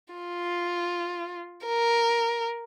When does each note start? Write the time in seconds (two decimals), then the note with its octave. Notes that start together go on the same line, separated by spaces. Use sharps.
0.14 F4
1.66 A#4